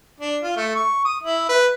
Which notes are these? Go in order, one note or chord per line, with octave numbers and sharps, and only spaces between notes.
D4
F4
A3
C#6
D#6
E4
B4